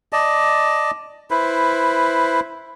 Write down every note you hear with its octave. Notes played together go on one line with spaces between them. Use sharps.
D5 D#5 A5
E4 B4 C5